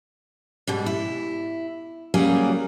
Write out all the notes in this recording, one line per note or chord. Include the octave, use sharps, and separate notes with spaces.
G#2 B2 G3
E4
C#3 F#3 G3 A#3 F4 G#4